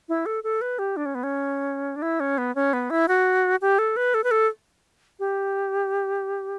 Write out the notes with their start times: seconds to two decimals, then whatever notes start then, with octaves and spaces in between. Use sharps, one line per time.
0.09 E4
0.26 A4
0.44 A4
0.61 B4
0.79 G4
0.97 D4
1.06 C#4
1.15 B3
1.23 C#4
1.96 D4
2.02 E4
2.20 C#4
2.38 B3
2.55 C#4
2.73 B3
2.90 E4
3.08 F#4
3.61 G4
3.79 A4
3.97 B4
4.14 A4
4.24 B4
4.31 A4
5.20 G4